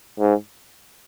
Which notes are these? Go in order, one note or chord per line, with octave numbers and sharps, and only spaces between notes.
G#2